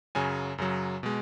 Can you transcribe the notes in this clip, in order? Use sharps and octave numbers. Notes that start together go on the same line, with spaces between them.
F#2 C#3 F#3 G#5
F#2 C#3 F#3
B2 G#3